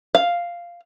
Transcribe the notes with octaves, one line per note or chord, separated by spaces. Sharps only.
F5